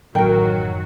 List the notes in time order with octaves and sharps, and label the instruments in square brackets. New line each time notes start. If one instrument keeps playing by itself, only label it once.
[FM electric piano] A1 F#2 [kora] D#3 A#4 [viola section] F#3 F#4 [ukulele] G5